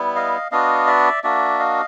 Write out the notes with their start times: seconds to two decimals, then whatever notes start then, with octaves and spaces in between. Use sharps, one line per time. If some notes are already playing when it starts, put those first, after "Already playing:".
Already playing: G3 B3 E4
0.16 D#5 F5
0.52 B3 D4 F#4 D#5 F5
0.87 D5 E5
1.23 A#3 D4 F#4 D5 E5
1.59 D#5 F5